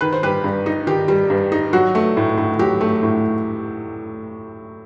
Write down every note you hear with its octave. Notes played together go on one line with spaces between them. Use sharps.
D#3 B4
C5
G3 G4 B4
G2
D#4
D#3 G4
G3
G2
D#4
F#3 F#4
A3
A2
A2
F#3 G4
A3
A2